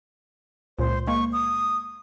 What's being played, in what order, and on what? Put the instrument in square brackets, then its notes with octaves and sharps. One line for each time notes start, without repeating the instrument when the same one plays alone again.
[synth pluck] C#2 A#2 [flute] C5
[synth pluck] G#3 A#3 [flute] C#6
[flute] D#6